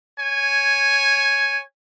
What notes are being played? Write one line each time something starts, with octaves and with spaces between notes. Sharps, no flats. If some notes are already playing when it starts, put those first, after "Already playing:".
C#5 G#5